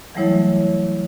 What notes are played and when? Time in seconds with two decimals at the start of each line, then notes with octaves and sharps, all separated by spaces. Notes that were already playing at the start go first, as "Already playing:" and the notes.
0.15 E3 F#3 G3 A3 E4 C#5